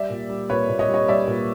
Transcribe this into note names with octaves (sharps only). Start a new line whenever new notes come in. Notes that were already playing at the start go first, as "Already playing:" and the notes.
Already playing: G3 D5 E5
A#2
G3
A#2 B4 C#5
A#2
C#5 D#5
G3
C#5 D#5
G3 D5 E5
A#2